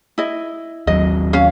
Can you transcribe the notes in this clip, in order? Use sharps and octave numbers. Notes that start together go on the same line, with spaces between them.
E4 D#5
D#2 F#3 D#5
C#4 F5